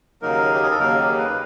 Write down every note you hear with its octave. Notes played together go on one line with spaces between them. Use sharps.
D#2 C#3 F#3 A#3 D#4 A#4
G4
G#4
A4
D#2 C#3 F#3 A#3 D#4 A#4
G4
B4